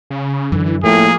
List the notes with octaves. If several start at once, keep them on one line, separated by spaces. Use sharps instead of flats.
C#3
F#2 D3 E3
A2 F3 A3 A#3 G#4